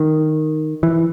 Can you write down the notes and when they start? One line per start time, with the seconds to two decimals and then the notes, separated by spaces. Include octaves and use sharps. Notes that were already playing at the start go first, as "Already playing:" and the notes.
Already playing: D#3
0.83 E3